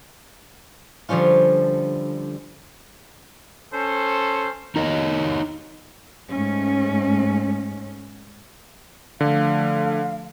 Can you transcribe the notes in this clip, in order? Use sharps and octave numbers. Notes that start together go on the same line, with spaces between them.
D3 F3 G3 C#4 F4
C#4 A4 C5
D#4 A#4 C#5 D#5
G#2 A3 C#4
D3 F3 A3 F5